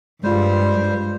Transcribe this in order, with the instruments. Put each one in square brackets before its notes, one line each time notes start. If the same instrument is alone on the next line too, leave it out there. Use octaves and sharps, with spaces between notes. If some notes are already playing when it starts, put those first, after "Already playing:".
[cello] G2 [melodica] G3 C5 [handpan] G#3 F4